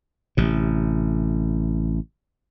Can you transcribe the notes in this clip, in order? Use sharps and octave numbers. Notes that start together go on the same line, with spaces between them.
A1 C3